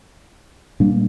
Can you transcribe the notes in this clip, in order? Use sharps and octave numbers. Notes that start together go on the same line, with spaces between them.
A#2 G3 A#3 D4